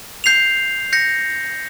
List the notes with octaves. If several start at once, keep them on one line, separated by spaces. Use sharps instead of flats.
G6 C7 F7
G6 A#6 C#7